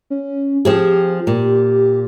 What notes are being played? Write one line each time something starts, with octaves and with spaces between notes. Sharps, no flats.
C#4
F3 C4 G4 G#4
A#2 G4